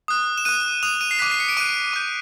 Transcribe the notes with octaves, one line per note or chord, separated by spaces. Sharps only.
D#6 F#6
E7
D#6 F#6 D#7
D#6 F#6 F7
D#7
C7
D6 F#6 B6
C7
C#7
D7
D6 F#6 D#7
D6 G6